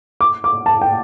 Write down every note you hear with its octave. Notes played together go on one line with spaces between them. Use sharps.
D6
D6
A5
G5